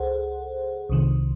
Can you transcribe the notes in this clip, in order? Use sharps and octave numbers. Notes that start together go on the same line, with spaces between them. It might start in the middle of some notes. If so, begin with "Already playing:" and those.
Already playing: C#2 G#4 A4 C5 F#5
C2 C3 D#3